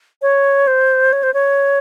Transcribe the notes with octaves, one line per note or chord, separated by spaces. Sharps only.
C#5
C5
C#5
C5
C#5